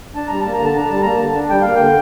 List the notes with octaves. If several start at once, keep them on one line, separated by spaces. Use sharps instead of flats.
D4 A5
G3 A#5
A5
A#3
A#5
D3
A5
D4 A#5
G3 A5
A#3 A#5
A5
D3
D4
G3 G5
A#3 F5
D3 G5